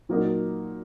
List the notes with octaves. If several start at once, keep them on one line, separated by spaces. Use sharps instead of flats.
A#2 F#3 A#3 D#4